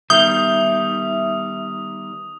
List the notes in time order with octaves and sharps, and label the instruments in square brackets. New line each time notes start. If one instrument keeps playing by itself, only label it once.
[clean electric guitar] D#3 G3 B3 [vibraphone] E5 [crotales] D#6 [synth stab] G6